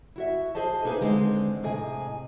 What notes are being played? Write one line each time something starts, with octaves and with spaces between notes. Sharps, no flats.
E4 F#4 E5
G#4 C5 D#5 A5
A#3 D#4 G#4 B4 G#5
D3 D#3 G#3 C4
A2 C3 G#4 D#5 G#5